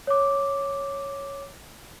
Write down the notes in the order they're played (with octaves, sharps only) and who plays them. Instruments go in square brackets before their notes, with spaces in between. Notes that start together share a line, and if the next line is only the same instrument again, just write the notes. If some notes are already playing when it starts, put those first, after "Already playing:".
[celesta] C#5 D6